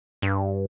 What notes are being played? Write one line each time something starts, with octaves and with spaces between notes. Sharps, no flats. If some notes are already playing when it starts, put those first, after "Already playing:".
G2